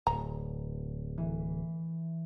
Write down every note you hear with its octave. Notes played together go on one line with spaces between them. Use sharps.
D1 A#5
E3